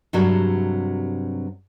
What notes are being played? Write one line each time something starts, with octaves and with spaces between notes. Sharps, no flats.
G2 C3 F#3 F#4 A4